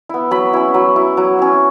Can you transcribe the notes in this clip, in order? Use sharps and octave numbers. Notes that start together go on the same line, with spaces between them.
B3 E4
F#3 B5
C#4 E4
F#3
E4
F#3
C#4 E4